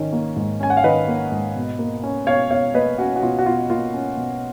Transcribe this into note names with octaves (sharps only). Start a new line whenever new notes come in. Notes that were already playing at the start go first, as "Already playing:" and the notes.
Already playing: G#2 D#3 C#4
A#3
G#2
C#4 G#5
F#5
F5
D#3 B4 D#5
A#3
G#2
B2
A#3
C#4
B2 C#5 F5
B2 C#5 F5
A#3 B4 D#5
C#4 F#4
F#4
B2 F4
F#4
B2 F4
A#3 F4
C#4
B2